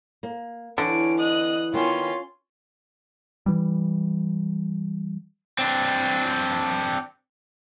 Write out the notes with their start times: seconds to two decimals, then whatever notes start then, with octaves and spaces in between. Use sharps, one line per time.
0.23 A#3
0.78 D3 E3 C#4 D7
1.19 D#5 D#6 F#6
1.74 D#3 B3 C#4 F4 C6
3.46 E3 G3
5.59 C4 D4